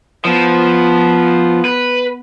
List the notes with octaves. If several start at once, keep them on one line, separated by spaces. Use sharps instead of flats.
F3 B3
B4